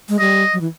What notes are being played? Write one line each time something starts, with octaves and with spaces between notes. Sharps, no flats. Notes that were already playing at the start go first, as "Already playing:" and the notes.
G#3
G3 D#5
F#3
E3